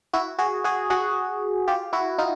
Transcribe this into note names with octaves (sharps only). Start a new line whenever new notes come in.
E4 F#4
F#4 G#4
F#4 G#4
F#4 G#4
F4 G4
E4 F#4
D#4 F4